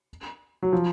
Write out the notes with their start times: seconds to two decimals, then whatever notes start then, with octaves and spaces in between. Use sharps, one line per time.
0.62 F#3
0.73 F3